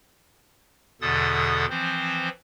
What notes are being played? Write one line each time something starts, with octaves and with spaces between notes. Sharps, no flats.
E2 B2 D3 A4 D#6 A6
E3 F3 C4 C5